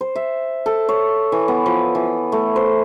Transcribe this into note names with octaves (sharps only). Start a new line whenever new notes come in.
C5
E5
A4
C#5
E3
B3
F3
E3
A3
C5